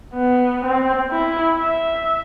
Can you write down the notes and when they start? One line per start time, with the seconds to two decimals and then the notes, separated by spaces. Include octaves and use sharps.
0.15 B3
0.65 C4
1.12 E4
1.57 E5